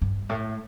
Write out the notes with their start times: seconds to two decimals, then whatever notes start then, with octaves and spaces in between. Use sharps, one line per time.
0.02 G2
0.29 A2